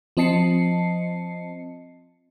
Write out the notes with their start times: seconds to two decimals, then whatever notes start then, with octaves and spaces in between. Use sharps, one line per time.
0.17 F3 C4 D#5 A5 C7 C#7